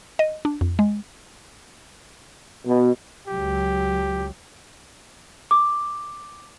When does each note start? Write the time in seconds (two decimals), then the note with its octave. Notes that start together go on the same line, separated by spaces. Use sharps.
0.19 D#5
0.45 D4
0.61 F2
0.79 G#3
2.66 B2
3.28 C#2 F#3 G4
5.51 D6